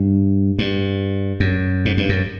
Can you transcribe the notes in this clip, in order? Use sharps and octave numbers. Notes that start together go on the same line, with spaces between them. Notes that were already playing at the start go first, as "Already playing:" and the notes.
Already playing: G2
G2
F#2
G#2
G2
F#2